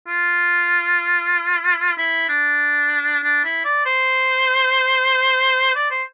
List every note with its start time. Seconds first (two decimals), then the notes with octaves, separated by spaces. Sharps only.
0.08 F4
1.97 E4
2.29 D4
3.23 D4
3.44 E4
3.65 D5
3.85 C5
5.75 D5
5.91 C5